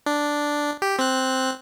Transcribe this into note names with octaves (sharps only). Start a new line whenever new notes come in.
D4
G4
C4 F#6